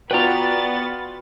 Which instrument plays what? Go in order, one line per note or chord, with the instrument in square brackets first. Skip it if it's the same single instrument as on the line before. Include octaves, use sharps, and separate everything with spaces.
[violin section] B3 A6 [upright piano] F4 G5 [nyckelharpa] F#4 [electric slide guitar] B4 D5 A#5